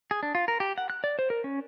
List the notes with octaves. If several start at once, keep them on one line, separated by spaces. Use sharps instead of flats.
G#4
D4
F4
A#4
G4
F#5
F#6
D5
C5
A#4
C#4